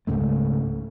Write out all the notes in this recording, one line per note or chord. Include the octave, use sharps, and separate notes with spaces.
C#2 G#2 C#3 A3